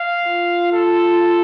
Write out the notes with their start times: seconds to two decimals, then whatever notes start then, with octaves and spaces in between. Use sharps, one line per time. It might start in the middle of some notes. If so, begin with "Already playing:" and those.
Already playing: F5
0.28 F4
0.72 A4